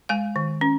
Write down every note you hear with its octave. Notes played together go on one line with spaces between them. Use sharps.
G#3 F5 G#5
D#3
C#4